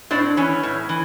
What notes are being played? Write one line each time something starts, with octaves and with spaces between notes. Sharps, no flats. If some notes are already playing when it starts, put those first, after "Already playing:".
A2 C4 D4
E3 B3 C#4
A2
E3